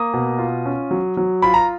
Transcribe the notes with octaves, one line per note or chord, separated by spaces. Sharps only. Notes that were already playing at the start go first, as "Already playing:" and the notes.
Already playing: A#3 D#6
B2
F4
C#4
F#3
F#3
F4 B5
A#5